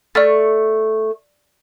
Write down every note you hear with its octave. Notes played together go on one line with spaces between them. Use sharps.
A3 D5 C#6 F6 A6